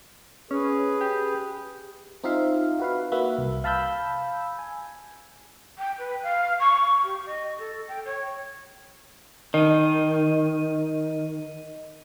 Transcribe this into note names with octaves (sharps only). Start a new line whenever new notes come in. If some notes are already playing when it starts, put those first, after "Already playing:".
C#4 G#4 B4
G4
C4 D#4 F4 E5 F5
F#4 B4 F5
A#3 F#4 B4 E5
C2
F5 A5 B5 E6 G6
G#5
G5
B4
F5
C#6
G4
D#5
A4
G5
C#5
D#3 D#5 D#7